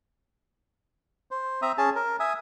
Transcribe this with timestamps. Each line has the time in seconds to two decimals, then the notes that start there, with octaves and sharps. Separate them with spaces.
1.31 C5
1.62 C4 E5 A#5 D#6
1.78 C#4 G#4 A5
1.95 A#4
2.20 E5 G#5 D#6